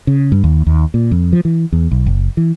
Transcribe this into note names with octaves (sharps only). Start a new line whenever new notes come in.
C#3
G2
D#2
D#2
A#2
F2
F3
E3
E2
B1
F#1
E3